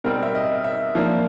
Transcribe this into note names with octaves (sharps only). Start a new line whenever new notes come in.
B2 G3 C4 A#4
E5
D#5
E5
F3 A#3 D4 F5